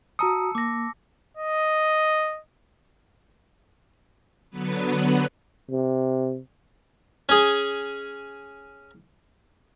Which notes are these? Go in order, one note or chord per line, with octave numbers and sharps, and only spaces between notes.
F#4 A5 A#5 D#6 E6 C#7
A#3 D6 A#6
D#5
D3 F#3 B3 B4
C3
C#4 G#4